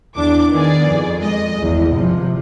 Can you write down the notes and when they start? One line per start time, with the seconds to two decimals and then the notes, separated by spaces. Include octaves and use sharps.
0.17 E2 D4 D6
0.52 D#3 B3 G#4 D5
0.86 F2
1.18 G#3 D#5
1.62 G#1 E2
1.95 C3 F3